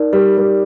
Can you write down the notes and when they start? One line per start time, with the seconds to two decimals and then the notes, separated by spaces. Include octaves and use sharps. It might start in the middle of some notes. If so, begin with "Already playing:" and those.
Already playing: D#4 A#4 D5
0.13 G3
0.37 G3